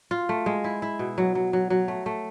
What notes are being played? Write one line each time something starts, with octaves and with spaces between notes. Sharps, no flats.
F4
A3
G#3
E4
E4
B2
F#3
F#3
F#3
F#3
A3
A3